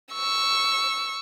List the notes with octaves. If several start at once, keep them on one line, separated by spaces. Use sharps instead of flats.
C#6 E6